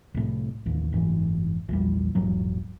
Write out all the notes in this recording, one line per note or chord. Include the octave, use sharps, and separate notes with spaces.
C2 A2
A1 D#2
F#1 G#2 E3
A#1 E2 G3
E1 A#1 G#2 F#3